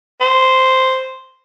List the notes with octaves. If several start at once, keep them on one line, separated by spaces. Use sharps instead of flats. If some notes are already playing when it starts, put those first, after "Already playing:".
C5